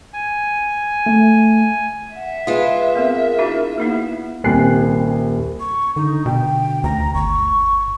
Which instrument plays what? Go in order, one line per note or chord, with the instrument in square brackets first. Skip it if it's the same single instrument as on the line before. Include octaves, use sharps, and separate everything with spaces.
[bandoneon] G#5
[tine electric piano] A3
[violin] E5 [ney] F#5
[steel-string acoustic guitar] G#3 F4 [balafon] G#4 [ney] B4
[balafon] B3 C4 [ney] A#4
[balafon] D4 E4 F#4
[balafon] A#3 D#4 E4 [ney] B3
[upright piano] D#1 C2 G5 G#5 F#6 C7
[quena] C#6
[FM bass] D3 [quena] D#4
[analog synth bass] B2 [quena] G5
[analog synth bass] D2 [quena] A#5
[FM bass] G1 [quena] C#6